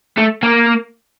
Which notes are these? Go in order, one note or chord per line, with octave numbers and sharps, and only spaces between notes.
A3
A#3